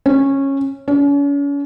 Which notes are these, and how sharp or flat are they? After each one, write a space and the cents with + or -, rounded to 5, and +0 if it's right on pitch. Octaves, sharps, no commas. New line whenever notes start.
C#4 -15
C#4 +40